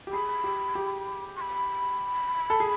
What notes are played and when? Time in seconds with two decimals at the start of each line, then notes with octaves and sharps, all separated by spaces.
0.07 G4
0.12 G#4 B5
0.44 G4
0.75 G4
1.36 C#6
1.41 B5
2.50 A4
2.60 G#4